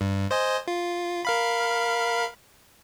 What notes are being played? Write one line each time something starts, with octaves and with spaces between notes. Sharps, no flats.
G2
C5 D#5 G#5
F4
A#4 F5 B5